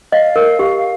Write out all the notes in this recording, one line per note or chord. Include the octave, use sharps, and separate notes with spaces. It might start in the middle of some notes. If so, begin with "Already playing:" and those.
D#5 F5
A#4
G4